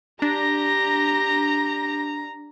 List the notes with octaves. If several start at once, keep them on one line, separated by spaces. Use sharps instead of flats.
D4 G4 A#5 A#6